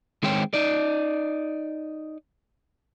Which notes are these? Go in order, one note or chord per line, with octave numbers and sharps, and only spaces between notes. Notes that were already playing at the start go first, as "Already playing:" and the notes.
D#3 G#3 C4 C5 C#5 G5
D#4 D5